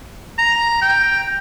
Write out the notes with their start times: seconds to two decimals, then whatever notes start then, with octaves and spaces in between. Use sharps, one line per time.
0.38 A#5
0.82 G5